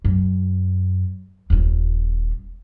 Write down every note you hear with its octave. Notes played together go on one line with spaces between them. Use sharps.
F#2
D#1 F4